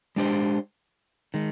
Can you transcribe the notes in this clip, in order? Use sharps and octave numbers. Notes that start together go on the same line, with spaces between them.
G#3 D4 G4 C5
D#3 G#3